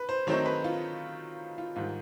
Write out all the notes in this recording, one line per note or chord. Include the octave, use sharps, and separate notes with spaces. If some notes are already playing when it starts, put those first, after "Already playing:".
Already playing: B4
C5
D#3 F#3 A3 C4 D#4 C#5
B4
F4
F4
G#2 D#3 G3 F4